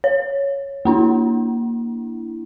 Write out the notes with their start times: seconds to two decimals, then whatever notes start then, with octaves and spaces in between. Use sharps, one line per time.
0.04 C#5
0.85 A#3 D4 E4